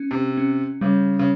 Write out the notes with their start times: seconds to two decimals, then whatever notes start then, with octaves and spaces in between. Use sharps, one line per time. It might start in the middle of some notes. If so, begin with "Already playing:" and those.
Already playing: C#4
0.11 C3
0.37 C#4
0.81 C#3 G3
1.19 C#3